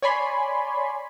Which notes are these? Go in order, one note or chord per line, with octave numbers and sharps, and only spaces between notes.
C#5 D5 G#5 B5 C6